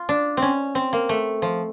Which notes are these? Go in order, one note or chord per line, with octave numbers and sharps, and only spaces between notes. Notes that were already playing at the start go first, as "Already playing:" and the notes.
Already playing: F4
D4
C4 C#4
C4
A#3
A3
F3